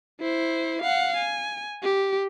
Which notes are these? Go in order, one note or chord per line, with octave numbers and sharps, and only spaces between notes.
E4 C5
F5 F#5
G#5
G4